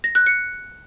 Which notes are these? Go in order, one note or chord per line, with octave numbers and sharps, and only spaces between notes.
A#6
F#6
C#7